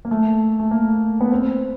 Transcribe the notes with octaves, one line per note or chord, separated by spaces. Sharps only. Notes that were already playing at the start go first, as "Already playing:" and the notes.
A#3
A3
A3
A#3
B3
C4